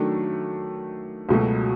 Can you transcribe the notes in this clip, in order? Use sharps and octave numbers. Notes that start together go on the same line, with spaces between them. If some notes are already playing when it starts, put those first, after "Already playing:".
Already playing: D#3 F#3 A3 D4
C#2 B2 F#3 A3